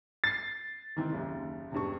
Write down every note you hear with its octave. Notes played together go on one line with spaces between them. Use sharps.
A6 C7
D#3 E3 C4
F#1 D#2
E1 G2 C#6